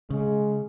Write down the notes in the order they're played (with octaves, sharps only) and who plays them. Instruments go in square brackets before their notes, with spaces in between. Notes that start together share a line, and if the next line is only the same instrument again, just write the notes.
[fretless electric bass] C#3 [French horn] G#3